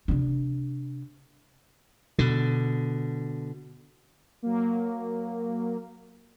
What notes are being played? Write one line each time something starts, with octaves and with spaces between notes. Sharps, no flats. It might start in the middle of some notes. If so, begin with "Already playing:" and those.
C3 D4
B2 D3
F#3 A#3